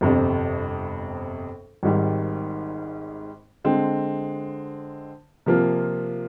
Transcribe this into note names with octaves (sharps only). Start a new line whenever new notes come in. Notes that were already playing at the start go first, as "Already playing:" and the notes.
G1 F2 C3
G#1 G#2 D#3 G3
D3 G#3 C4
C3 F3 A#3 F4